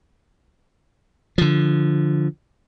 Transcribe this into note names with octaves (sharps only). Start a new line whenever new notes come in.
D3 F3